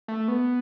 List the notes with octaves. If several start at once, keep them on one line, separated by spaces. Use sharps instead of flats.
A3
B3